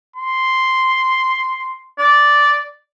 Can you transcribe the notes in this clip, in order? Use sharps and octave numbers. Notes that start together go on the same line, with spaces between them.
C6
D5